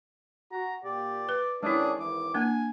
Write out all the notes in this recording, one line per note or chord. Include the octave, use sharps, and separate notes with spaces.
F#4 A#5
A#2 G4 D5
B4
D#3 G#3 C#4 D4 E4 G#4
G#1 E3 D6
A#3 D4 G#5